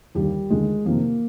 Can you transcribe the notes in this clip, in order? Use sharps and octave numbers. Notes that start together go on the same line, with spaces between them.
D#2 D3 G3
D#2 D3 G#3
F2 C3 D#3 A#3